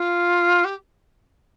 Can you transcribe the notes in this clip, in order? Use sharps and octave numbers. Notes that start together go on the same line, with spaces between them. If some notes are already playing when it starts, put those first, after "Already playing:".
Already playing: F4
G4